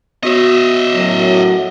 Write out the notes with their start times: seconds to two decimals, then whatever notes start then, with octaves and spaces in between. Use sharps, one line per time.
0.23 B3 F#4 C#5 D#5 E5
0.92 F#2 A2 F#3